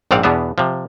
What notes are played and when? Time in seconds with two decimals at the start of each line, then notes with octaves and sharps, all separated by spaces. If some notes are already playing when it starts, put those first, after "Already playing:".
0.11 A#1 G#2 C4 D5 F5 F#5
0.23 E2 B2 B3 D4 E5
0.58 C3 F3